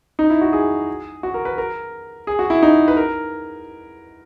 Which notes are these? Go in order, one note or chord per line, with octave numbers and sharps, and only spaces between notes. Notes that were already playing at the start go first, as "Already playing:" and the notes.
D#4
E4
F#4
G#4
F#4
A#4
B4
A#4
G#4
F#4
E4
D#4
B4
A#4